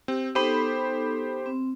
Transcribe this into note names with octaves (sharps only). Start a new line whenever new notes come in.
C4 G4
B3 D#4 G4 A4 C5 B5
C4